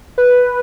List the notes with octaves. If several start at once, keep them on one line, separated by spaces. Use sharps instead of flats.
B4